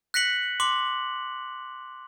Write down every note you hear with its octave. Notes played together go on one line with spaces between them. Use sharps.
F#6 A#6 B6 C#7 F#7
C6 D6 F#7